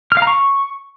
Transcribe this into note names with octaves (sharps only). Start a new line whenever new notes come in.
F6
F5
A#5
C#6